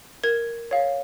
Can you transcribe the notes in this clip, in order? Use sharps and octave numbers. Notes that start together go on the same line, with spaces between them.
A#4 G#6
C#5 F5